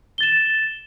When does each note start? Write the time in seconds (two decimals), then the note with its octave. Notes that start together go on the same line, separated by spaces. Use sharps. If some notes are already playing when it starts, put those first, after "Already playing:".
0.18 G7
0.21 A6
0.23 E7